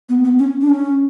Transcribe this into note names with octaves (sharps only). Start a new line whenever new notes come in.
B3
B3
C#4
D4
C#4